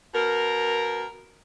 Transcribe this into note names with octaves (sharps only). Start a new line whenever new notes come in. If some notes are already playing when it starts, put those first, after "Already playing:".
B2 A#4